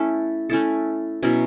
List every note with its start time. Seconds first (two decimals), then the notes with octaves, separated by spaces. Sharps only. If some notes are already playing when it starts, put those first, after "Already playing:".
Already playing: A3 C#4 E4 A4
0.50 A3 C#4 E4 A4
1.23 B2 F#3 C#4 E4